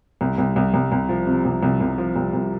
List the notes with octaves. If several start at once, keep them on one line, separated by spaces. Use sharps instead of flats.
C2
C2
C2
C2
C2
F3
C3
C2
C2
C2
F3
C2
C2